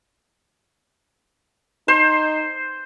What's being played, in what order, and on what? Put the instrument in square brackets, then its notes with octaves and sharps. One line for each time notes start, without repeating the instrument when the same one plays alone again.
[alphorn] D#4 [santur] C5